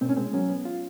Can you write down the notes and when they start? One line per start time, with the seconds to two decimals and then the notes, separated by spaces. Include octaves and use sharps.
0.01 B2 C4
0.09 C#4
0.16 G#3 C4
0.33 F#3 C#4
0.49 B3
0.65 F4